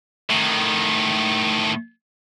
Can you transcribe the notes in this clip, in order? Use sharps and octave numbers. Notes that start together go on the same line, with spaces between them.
A2 D#3